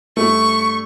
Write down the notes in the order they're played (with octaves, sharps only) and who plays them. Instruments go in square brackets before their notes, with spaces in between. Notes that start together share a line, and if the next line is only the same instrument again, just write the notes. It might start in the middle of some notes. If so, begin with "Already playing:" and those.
[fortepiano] G2 A3 [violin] C#6